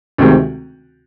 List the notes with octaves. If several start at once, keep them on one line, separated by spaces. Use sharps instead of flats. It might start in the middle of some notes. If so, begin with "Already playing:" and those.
D2 C3 D#3 G#3 C4